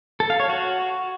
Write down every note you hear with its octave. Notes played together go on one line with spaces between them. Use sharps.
A4
F5
C#5
F#4